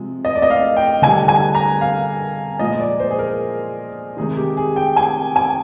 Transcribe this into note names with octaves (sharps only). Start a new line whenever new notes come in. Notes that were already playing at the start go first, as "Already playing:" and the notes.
Already playing: C3 F3 G#3
D#5
D5
D#5
F5
G5
D3 G3 G#5
G#5
A#5
F5
A#2 F3 G#3 D#5
D5
C5
G#4
A#4
C3 D#3 G#3 G#4
G4
G#4
G5
G#5
G#5